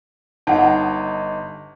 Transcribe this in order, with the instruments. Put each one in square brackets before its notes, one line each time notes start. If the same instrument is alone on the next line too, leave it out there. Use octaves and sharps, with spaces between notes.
[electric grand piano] G1 D#4 [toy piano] F#5 A5